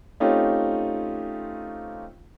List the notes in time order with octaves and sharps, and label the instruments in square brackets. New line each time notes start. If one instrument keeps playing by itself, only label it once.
[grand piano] A3 C4 C#4 D#4 F4 G4